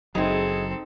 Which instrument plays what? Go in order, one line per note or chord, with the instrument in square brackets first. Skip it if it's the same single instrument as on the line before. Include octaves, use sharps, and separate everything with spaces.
[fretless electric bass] F#1 F#3 [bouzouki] G#3 E4 [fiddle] C4 A4 [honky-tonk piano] D#4